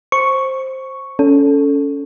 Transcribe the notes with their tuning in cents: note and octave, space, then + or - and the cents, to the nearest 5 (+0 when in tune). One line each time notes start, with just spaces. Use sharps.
C5 +10 C#6 +0
C#4 +20 A4 +0